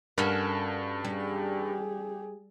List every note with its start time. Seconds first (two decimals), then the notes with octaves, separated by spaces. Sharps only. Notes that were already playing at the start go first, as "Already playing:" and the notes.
0.18 G2 C#4 F#4 A4 A#4
1.05 G3 G4 G#4